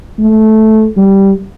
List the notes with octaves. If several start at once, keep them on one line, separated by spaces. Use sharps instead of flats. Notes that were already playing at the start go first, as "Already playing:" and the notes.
A3
G3